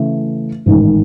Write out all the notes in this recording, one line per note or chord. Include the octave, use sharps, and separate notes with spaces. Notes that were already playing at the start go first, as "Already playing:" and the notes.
Already playing: C#3 E3 A3
A1 G#2 D#3